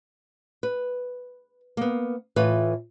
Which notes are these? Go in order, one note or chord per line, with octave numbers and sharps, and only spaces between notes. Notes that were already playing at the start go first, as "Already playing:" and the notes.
B4
A#3 B3
A2 E3 F4 B4